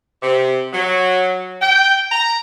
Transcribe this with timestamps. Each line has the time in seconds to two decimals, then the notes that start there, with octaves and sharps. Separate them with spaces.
0.22 C3
0.73 F#3
1.61 G5
2.11 A#5